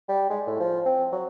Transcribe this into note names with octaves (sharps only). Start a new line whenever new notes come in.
G3
G#3
A2
F3
C4
F#3